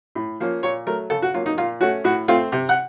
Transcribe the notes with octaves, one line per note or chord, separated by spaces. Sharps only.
A2
F3 A#3 C#4
A#2 C#5
F#3 A3 A#4
C#3 A4
F#4
F#3 A#3 C#4 F4
D#4
A#2 F4
A3 C#4 F#4
A2 F#4
A3 C4 F4
C3
F#5